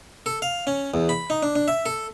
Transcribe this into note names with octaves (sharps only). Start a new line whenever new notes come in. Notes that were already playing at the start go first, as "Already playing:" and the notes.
A4
F5
C#4
E2
B5
D#4
D4
D4
E5
A4